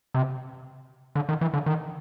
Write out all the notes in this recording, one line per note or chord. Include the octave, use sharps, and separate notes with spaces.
C3
D3
D#3
E3
D3
D#3